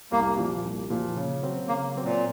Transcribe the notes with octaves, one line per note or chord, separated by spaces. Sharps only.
C2 A#3
A#2 F3
C2
A#2 F3
C#3
F#3 C4
C#3 A#3
F#3 C4
A#2